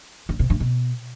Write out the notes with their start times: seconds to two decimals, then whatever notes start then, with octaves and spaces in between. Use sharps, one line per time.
0.29 D3
0.39 C3
0.50 G2
0.60 B2